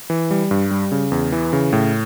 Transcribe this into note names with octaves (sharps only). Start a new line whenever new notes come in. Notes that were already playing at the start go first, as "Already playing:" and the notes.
E3
G3
G2
G3
C#3
E2
E3
C#3
A2